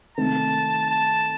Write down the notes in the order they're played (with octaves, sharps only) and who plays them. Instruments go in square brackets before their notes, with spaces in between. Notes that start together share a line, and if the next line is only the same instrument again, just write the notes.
[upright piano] C3 D#3 A3 C4 [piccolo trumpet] A5
[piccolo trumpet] A5